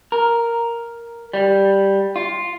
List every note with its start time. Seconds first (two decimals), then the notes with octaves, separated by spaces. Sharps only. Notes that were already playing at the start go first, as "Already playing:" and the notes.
0.12 A#4
1.33 G3
2.16 F4